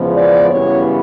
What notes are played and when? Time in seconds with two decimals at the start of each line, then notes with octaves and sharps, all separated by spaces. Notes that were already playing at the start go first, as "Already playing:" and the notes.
Already playing: E2 C#3 F3 G#3 B3
0.14 D5
0.51 F#2 C#3 E3 G3 B3 C#5